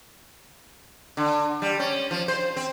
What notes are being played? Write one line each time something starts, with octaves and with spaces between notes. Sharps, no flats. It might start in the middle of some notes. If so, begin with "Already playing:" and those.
D3
G3
C#4
F3
C5
C4